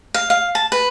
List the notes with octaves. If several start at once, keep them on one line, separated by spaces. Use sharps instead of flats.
F5
F5
A5
B4